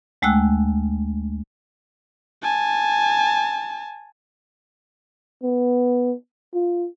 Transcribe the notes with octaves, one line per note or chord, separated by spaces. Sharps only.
D2 G#3 A3 G5 E6 F#6
G#5 A5
B3
F4